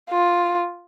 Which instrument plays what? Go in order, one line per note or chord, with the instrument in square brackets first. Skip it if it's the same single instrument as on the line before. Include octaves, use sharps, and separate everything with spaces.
[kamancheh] F4